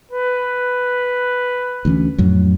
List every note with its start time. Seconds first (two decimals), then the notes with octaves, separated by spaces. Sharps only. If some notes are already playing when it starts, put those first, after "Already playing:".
0.12 B4
1.85 D2 E3 C#4
2.18 F2 A2 F#3